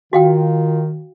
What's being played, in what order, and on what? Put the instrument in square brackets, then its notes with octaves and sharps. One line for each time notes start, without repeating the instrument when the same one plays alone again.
[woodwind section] D#3 [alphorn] F4 [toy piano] F#4 F5 G5